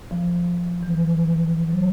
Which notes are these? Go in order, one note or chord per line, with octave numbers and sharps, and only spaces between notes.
F3
E3
F3
F#3